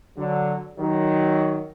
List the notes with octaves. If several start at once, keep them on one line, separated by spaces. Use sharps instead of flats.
D3 F#3
D#3 F#3